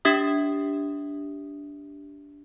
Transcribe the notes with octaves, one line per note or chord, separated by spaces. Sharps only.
D4 G4 E5 D#6